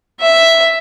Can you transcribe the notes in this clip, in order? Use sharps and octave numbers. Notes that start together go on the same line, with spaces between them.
E5